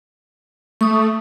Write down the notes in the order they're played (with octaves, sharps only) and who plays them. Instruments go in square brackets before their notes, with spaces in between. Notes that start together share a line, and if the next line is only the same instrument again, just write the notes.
[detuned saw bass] A3 [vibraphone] C#6 D#6